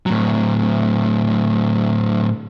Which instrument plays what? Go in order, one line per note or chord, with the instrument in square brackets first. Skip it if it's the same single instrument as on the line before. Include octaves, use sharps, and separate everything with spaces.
[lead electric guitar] A2 F#3